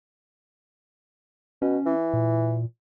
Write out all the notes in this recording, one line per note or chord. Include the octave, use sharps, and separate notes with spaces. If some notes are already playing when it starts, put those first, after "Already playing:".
B2 C#4
E3
A#2